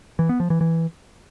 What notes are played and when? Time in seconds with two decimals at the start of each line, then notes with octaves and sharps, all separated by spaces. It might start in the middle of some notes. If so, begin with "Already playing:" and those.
0.19 E3
0.29 B3
0.40 F3
0.50 E3
0.61 E3